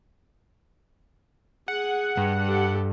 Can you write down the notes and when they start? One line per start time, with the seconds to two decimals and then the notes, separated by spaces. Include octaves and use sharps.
1.68 G#4 F#5
2.17 G2
2.46 G4 A4